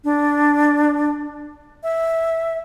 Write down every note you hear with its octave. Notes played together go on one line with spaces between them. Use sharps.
D4
E5